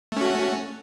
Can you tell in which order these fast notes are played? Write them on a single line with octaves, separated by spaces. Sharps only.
A3 C#4 F#4